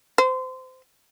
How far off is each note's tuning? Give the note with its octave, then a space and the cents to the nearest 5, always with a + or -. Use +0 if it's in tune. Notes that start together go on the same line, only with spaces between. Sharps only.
C5 -25